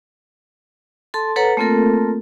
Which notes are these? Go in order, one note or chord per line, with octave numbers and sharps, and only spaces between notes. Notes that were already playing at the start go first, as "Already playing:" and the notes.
A4 A5 C6
A4 B4 C#5 F#5 A#5
A3 A#3 C4 F4 A4 A#4